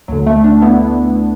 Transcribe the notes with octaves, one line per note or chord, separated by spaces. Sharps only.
D2 D3 F#3
A3
A3 D4
B3 E4